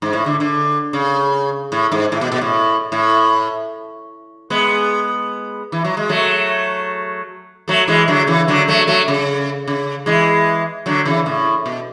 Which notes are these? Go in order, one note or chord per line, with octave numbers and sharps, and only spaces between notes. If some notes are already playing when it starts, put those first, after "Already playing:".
G#2
A2
D3
D3
C#3
A2
G#2
A2
B2
B2
A2
A2
G#3 B3
E3
F#3
G#3
F#3 A3
F#3 A3
E3 G#3
D3 F#3
C#3 E3
D3 F#3
F#3 A3
F#3 A3
C#3
C#3
E3 G#3
D3 F#3
C#3 E3
A2
B2